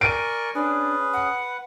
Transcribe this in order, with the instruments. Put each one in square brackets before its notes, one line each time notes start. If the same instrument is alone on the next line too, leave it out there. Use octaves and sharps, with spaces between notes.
[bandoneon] A#4 [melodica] D5 G#5 C#6 [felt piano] D7 D#7
[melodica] C#4 G#4 [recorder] D4 [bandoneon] B4
[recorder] F#5